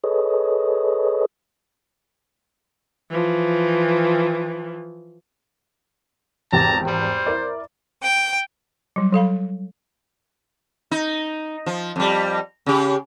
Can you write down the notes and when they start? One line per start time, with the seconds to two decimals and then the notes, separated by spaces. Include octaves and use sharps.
0.04 G#4 A4 B4 C#5 D#5
3.10 E3 F3
6.53 G#1 E2 G4 A5 A#5
6.87 G3 C5
7.26 E4 A#4 D5
8.01 G5
8.96 F#3 G3
9.12 F#3 A4 F5 B5
10.91 D#4
11.66 F3
11.96 F2 G3
12.66 C#3 G4